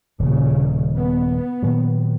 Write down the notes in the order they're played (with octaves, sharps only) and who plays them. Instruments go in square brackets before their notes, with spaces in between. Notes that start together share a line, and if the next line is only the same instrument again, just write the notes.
[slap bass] D#1 [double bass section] A#2 C#3
[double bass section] B3
[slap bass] A#2 D#3 F#3